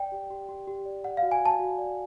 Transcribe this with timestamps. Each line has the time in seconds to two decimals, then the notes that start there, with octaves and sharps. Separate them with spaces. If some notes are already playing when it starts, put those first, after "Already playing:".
Already playing: D5 G5
0.12 G4
0.30 G4
0.49 G4
0.68 G4
0.86 D5
1.04 D5 F#5
1.17 F5
1.22 F#4
1.31 G#5
1.41 F#4 A5
1.59 F#4
1.78 D5